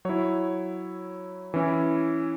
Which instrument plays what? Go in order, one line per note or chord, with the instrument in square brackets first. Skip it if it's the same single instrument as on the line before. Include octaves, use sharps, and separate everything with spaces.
[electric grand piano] F#3 E4 C#5
E3 C#4 E4